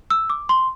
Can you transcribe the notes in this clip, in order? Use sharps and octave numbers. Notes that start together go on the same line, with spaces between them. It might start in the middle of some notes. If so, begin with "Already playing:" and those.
E6
D6
C6